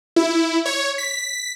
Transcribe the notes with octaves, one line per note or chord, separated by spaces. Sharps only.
E4
C#5
B6